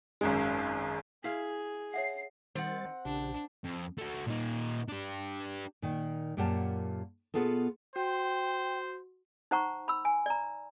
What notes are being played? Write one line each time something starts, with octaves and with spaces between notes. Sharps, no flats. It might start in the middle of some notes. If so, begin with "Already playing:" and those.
G#1 F#2 G#3
E4 G#4 F5
C#5 E5 F#5 C7
D#3 G3 C4 C5 F#5 A6
A#1 C#3 D4 G4
F2
A3 F#4
A#2 D#4
D4 G4
A#2 D#3
F#2 A#2 G4 A#4 F#5 A5
B2 G3 B3 F4 G#4 A4
F#4 C5 G5
D#4 C5 F#5 A#5 C#6
B5 E6
G#5
D5 A#5